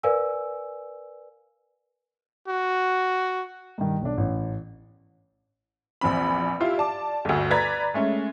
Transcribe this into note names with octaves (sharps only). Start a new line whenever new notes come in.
A#4 B4 D5 F5 G#5 E6
F#4
G2 D#3
B1 D4
A1
A#1 E2 C4 B5
E4 F4 G4
D5 A5 D6
G1 D2
B4 D5 A#5 G#6 A6 B6
G#3 A3 C#4